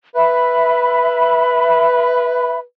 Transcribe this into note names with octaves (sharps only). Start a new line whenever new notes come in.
B4 E5 B5